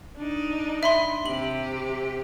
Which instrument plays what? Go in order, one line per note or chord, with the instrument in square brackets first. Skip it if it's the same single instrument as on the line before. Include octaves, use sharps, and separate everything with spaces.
[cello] D4 D#4
[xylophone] E5 B5 C6
[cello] C3 G4 [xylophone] F#7